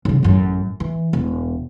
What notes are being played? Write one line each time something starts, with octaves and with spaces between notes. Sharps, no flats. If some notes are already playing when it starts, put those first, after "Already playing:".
B1 C#3
A1 F#2
E3
E1